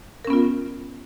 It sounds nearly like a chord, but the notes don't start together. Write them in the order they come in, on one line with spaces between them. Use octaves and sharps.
A#4 C#4 B3 F4